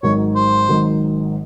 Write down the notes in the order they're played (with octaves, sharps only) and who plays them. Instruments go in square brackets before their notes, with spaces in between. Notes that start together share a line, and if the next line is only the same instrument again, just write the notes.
[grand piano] G#1 G#2 D#3 F#3 [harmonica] C#5
[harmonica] C5
[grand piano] G#1 G#2 D#3 F#3